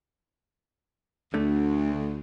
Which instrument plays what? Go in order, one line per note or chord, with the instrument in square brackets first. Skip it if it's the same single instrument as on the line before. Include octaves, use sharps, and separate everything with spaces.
[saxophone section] D2 [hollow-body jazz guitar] D3 A3